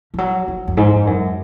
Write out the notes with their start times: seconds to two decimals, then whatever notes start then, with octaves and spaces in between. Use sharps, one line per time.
0.14 F3
0.18 F#3
0.48 F3
0.68 F#2
0.77 G#2
1.07 F#2